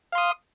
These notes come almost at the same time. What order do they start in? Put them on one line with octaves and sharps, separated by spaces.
F5 C6 D#6